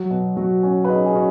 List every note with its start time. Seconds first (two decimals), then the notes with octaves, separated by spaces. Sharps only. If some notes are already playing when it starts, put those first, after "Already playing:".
Already playing: F#3 F#4
0.10 B2
0.37 F#3 F#4
0.63 C#4
0.84 B4
0.89 C#4 D#4 G#4
1.06 D#4 G#4
1.15 C#4 F#4